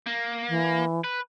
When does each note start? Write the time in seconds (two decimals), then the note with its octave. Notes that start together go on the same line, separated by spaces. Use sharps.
0.06 A#3
0.49 E3
1.04 B4